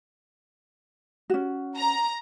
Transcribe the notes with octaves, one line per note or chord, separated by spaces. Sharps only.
C#4 F#4
A#5